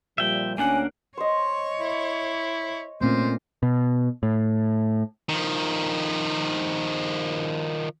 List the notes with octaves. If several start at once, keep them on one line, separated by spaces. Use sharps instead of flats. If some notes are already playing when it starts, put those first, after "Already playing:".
A#2 F3 G3 E5 G5
D2 A#3 C#4 D4 F#5 G#5
C5 C#5 D#5
E4
A#2 A3 C4 C#4 C5
B2
A2
D#3 F3